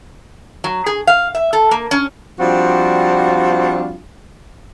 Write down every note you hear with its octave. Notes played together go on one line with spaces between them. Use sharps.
F#3
G#4
F5
E5
A4
A#3
C#4
F3 G3 C4 D4 F4 F#4